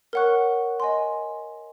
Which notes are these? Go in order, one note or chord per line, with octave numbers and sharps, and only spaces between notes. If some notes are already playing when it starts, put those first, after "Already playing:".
A#4 C#5 F#5 C#6 F#6
D#5 G#5 C6